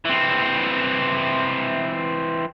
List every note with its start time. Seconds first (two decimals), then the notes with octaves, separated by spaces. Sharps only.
0.05 E3 C4